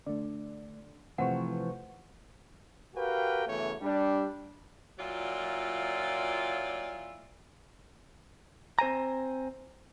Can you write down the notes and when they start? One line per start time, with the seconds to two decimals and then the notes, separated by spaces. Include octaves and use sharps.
0.06 D3 A3 D5
1.18 C3 E3 F3 A3 B4 C5 F#5 C#6
2.95 F#4 G4 A#4 B4 F5 G5
3.47 F#2 C#3 E3 A3 B3 C#5
3.81 G3 D4
4.98 A#2 F#3 E4 F4 D5
8.79 C4 C5 G#5 A#5